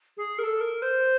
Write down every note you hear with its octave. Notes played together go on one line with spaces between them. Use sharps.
G#4
A#4
A4
A#4
C5